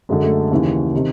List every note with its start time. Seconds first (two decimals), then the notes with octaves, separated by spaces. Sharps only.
0.09 F#2 D3 G#3
0.23 A3
0.51 D#2 C#3 E3
0.95 C3 D#3